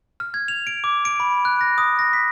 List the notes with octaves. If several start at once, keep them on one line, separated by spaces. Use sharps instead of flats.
F6
G#6
F7
D7
D6
D7
B5
F#6
A#6
D#6
A#6
B6